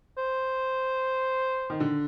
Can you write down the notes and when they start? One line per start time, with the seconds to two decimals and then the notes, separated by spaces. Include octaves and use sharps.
0.17 C5
1.70 D#3
1.80 D3